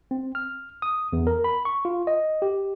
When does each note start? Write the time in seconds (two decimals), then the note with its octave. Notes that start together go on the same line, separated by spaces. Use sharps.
0.11 C4
0.35 F6
0.82 D#6
1.13 E2
1.27 A#4
1.44 B5
1.65 C#6
1.85 F4
2.07 D#5
2.42 G4